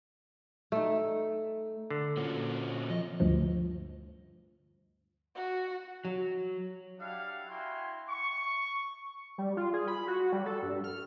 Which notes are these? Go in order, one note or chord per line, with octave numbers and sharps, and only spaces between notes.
A3 D#4
D3
A#2 C4 C#4 F#4
F2 D#5
D2 G2 F3
F#4
F#3
D4 E4 G4 F5 F#5
E4 F#4 E5 G5 G#5 C6
C#6
G3
F4
G#4
B5
F#4
G3
A4
G2
F6